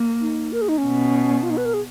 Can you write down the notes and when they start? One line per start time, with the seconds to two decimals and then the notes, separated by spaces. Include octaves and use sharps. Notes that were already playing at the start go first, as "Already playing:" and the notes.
Already playing: A#3
0.21 D#4
0.52 A#4
0.62 G#4
0.69 D#4
0.78 C#4
0.85 B2
1.43 F4
1.50 D#4
1.57 B4
1.65 A#4
1.74 G#4